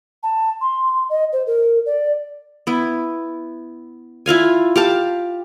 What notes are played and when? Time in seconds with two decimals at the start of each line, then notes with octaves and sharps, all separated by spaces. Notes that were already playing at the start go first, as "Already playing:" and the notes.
0.23 A5
0.61 C6
1.09 D#5
1.33 C5
1.47 A#4
1.86 D5
2.67 B3 E4
4.26 E4 F4 F5 G#5
4.76 G4 F5 A5